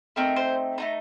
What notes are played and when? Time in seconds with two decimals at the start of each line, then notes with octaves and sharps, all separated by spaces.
0.16 A3 C4 D#4 A#4
0.36 C5
0.78 A3 C4 D#4 A#5